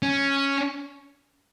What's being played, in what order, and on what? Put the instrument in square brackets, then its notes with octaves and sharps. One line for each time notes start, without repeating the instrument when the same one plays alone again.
[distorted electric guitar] C#4